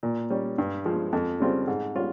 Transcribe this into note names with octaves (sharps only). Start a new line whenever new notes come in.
A#2
G3 C#4
G2
F3 G#3
F2
C#3 G3 C4 F4
G#2
G3 C#4 F4